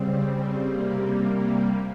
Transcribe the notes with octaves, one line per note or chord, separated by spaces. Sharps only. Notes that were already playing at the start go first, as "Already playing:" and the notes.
Already playing: C#3 G3 C4
C3 G3 A#3